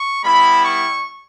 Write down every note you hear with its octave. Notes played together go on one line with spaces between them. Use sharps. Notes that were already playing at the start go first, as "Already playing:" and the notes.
Already playing: C#6
G3 B3 E4 B5
C#6